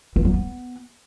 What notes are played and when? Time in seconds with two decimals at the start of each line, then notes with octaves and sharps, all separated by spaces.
0.16 E3
0.25 F#3
0.34 B3